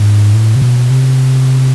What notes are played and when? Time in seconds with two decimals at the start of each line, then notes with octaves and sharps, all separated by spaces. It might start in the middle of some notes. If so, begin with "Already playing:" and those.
Already playing: G#2
0.34 A2
0.56 C3
0.62 B2
0.90 C3